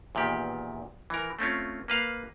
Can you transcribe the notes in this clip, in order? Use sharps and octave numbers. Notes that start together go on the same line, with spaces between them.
E2 A#2 D#3 G4
E3 A#4
A3 C4 C#4 F4
A#3 B4 F5